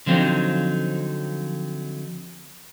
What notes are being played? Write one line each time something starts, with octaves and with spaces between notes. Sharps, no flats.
D3 F3 F#3 C4 D#4